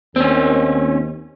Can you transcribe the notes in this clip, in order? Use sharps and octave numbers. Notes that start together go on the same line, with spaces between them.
D#2 C4 C#4